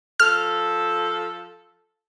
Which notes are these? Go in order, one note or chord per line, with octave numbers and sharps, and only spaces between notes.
F3 A4 F6